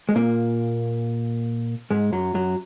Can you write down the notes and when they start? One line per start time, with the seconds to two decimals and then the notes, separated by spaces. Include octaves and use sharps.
0.09 G#3
0.16 A#2 A#3
1.91 G#2 G#3
2.12 F#2 F#3
2.34 F#2 F#3